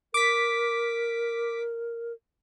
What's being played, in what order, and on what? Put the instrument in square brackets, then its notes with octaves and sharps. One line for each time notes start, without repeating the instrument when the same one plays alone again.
[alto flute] A#4 [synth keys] D6 B6